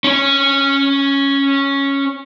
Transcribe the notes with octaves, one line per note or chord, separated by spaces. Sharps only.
C#4 C#5